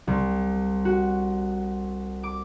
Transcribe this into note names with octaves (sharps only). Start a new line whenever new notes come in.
C2
F#4
D6